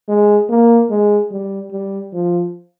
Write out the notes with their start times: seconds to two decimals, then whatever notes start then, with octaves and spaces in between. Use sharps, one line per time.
0.08 G#3
0.49 A#3
0.90 G#3
1.32 G3
1.71 G3
2.13 F3